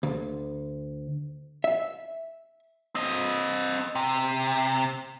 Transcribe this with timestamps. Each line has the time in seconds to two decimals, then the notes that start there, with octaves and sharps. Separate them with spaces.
0.03 D2
1.64 E5
2.95 C4 D#5
3.95 C3